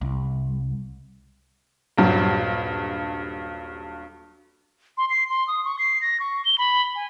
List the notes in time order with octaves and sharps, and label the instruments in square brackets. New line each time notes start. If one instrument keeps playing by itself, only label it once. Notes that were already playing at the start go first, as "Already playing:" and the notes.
[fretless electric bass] C2
[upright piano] D#1 G2 F#3
[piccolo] C6
C7
C6
D#6
C#6
C7
A#6
C#6
G7
B5
G#5